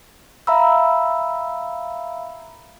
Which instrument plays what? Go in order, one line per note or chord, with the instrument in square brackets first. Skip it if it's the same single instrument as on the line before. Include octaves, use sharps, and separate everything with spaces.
[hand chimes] E5 F5 A#5 B5 E6